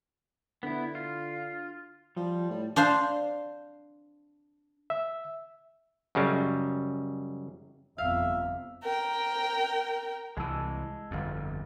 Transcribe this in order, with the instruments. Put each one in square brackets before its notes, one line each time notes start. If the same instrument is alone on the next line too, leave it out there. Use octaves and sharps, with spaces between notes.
[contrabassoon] D3 [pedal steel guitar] B3 E4
[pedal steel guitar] F4
[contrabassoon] F3 [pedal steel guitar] G3
[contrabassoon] A2
[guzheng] D4 C5 F5
[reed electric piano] E5
[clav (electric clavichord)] F#2 C#3 G3 G#3
[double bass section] G1 F2 C3 [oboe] E5 [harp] F5
[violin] A#4 G5
[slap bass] C2 E3 [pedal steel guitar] G#3 A5 E6
[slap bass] G1 F2